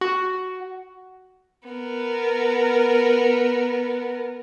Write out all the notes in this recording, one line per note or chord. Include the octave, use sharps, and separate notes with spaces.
F#4
B3 A#4